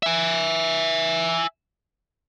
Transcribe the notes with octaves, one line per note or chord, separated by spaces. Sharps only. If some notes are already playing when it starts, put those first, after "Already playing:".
E5 G#5